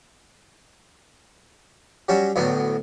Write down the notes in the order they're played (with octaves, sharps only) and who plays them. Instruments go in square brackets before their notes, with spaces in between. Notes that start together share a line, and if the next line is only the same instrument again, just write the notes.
[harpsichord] F#3 G3 C#4 F#4
D2 A2 F#3 B3